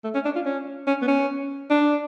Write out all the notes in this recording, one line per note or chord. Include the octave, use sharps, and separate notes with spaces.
A3
C#4
D4
F4
C#4
C#4
B3
C#4
D4